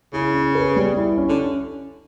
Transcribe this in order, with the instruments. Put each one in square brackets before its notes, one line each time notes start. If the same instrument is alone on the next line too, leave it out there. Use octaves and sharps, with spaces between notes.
[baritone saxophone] C#3 [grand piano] E4
[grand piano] C#4
B4
G3
E4
C#4
[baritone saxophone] D3